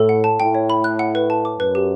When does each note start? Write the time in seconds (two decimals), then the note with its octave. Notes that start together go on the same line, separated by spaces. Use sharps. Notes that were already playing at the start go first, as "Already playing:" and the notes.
Already playing: A2 A4
0.09 F#5
0.24 A5
0.40 A2 G5
0.55 C#5
0.70 B5
0.84 F#6
0.99 F#5
1.15 B4
1.30 A5
1.45 D6
1.60 F#2 B4
1.75 G4